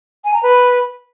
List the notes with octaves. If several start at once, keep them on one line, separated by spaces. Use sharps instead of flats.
G#5
A#5
B4